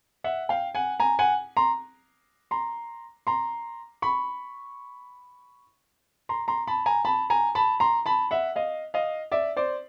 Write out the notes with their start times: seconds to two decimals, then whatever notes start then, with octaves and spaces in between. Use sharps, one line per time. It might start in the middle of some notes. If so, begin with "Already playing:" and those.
0.24 E5 F#5
0.49 F5 G5
0.75 F#5 G#5
1.00 G#5 A#5
1.19 F#5 G#5
1.57 A#5 C6
2.51 A#5 C6
3.27 A#5 C6
4.02 B5 C#6
6.29 A#5 C6
6.48 A#5 C6
6.67 A5 B5
6.86 G#5 A#5
7.05 A5 B5
7.30 G#5 A#5
7.55 A5 B5
7.80 A#5 C6
8.06 A5 B5
8.31 E5 F#5
8.56 D#5 F5
8.94 D#5 F5
9.32 D5 E5
9.57 C5 D5